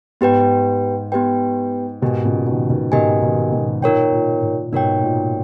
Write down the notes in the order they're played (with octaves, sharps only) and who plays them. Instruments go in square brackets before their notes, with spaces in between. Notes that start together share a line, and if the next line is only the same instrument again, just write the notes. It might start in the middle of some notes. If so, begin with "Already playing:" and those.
[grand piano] G#2 [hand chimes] B3 G4 B4 G5
[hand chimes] B3 G4 B4 G5
[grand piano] G#2 B2 [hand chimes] G4 A#4 D#5 G#5
[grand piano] A#2 C#3
B2 D#3
B2 D#3
[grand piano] G#2 B2 [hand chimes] G4 A#4 D#5 G#5
[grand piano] B2 D#3
G#2 B2
[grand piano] A#2 [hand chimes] D#4 A#4 C#5 G5
[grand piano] A#2
A#2
[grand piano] G#2 B2 [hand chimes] D#4 A#4 C#5 G5
[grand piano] A#2